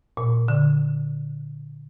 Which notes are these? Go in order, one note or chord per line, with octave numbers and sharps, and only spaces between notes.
A#2
D3